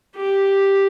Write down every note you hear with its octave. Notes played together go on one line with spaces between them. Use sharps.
G4